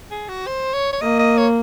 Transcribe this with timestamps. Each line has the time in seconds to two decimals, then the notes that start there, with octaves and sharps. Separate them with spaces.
0.11 G#4
0.28 F#4
0.47 C5
0.73 C#5
0.92 C#5
1.01 A#3 D#5
1.19 D#5
1.37 C#5